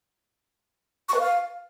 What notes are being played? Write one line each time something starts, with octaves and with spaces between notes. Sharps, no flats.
C#6
B4
F5